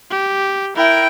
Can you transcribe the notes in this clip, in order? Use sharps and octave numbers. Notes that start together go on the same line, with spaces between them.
G4
E4 A#4 G5